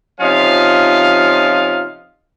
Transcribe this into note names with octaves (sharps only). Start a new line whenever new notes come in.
C3 F3 C#4 D#4 F4 F5